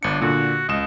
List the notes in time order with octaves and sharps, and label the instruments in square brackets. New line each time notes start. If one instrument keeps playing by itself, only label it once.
[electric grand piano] G1 C#7 [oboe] D4
[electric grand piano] A#2 D3 [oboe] F#4
[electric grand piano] C#2 E7 [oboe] D#5